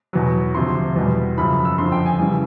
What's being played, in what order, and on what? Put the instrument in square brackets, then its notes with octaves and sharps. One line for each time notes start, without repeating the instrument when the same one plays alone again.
[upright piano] E2 B2 F#3
D2 C3 F3 C6
E2 B2 G3
F#2 C#3 F3 B5
E6
F2 D3 F3 C6
G5
G#5
C#3 E3 G3